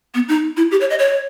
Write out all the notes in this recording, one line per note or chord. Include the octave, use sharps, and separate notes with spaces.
B3
D#4
E4
G4
C#5
D#5
C#5